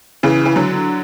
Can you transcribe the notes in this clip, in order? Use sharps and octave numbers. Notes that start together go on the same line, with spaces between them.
C#3 E3
E3
D3 F#3